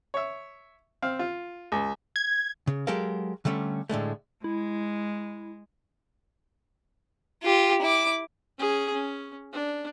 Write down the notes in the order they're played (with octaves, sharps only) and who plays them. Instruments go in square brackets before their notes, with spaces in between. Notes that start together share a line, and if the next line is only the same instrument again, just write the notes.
[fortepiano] C#5 E5
C4 F5
F4
C#2
[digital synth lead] G#6
[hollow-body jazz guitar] C#3
F#3 G#3 G4 A4 A#4 F5
D3 G3 A3 C#4
A2 D3 G#3 A3
[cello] G#3 [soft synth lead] E4
[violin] F4 G4
E4 D6
[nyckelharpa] C#4 G#4
C#4
D4